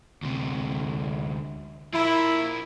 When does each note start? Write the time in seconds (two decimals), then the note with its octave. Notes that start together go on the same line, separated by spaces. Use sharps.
0.22 D2 C3
1.93 F3 E4 A#4